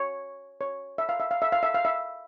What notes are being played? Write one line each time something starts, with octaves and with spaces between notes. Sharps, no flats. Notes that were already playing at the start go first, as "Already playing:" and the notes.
Already playing: C#5
C#5
E5
F5
E5
F5
E5
F5
E5
F5
E5